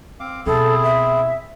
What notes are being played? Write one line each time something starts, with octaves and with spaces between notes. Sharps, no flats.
C4 F5 D6
B2 C4 E4 G#4 A4
E5